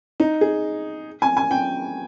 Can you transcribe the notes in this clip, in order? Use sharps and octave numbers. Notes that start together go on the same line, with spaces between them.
D#4
G#4
G#5
G#5
G5